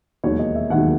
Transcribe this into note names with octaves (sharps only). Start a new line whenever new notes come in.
E1 D#2 D#3 F#3 C#5
D#5
E5
E1 D#2 D#3 F#3 F#5